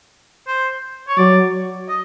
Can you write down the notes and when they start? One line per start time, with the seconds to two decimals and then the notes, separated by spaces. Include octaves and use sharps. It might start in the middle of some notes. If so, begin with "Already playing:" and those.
0.47 C5
1.08 C#5
1.18 F#3 D5
1.89 D#5